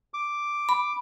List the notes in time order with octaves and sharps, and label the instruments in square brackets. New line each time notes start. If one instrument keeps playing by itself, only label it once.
[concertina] D6
[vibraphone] B5